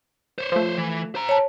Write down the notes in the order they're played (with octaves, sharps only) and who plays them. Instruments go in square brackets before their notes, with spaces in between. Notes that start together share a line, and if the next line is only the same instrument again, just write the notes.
[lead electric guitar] C5 C#5
[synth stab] F3 A3
[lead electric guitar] E3
C5 A#5
[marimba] C#5 A5